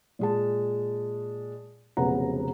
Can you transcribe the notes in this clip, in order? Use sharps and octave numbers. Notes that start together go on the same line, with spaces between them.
A#2 G#3 A5
F1 B1 C#3 B4 F#5 A#5